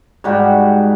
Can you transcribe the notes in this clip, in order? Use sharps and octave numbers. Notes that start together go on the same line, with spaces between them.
G#2 G3 F#4